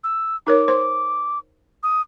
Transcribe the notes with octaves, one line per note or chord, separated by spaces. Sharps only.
E6
D#4 A#4 C#5 D6
C5 C6
D#6